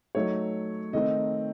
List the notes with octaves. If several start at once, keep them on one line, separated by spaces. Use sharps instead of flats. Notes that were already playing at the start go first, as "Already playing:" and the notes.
F#3 A3 D#4 C#5
D#3 A3 C4 D#4 D#5